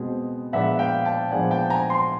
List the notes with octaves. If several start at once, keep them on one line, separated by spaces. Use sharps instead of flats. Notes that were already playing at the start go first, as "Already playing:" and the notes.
Already playing: B2 G#3 C4
A#2 F3 G#3 B3 D4 E5 F#5
F5 G5
G5 A5
A#2 F3 G#3 B3 D4 F#5 G#5
G5 A5
G#5 A#5
A#5 C6